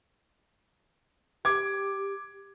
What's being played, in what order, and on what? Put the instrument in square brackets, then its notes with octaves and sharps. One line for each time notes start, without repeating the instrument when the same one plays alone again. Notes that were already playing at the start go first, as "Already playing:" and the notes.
[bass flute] G4 [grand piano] D6 G#6